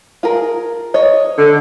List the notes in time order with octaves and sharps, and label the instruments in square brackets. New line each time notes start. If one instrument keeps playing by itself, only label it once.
[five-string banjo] F4 G#4 A#4
[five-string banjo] C#5 [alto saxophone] D#5
[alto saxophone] D3